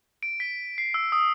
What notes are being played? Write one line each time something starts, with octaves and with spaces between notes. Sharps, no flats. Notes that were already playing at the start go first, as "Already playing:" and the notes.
D7
B6
C7
E6
D#6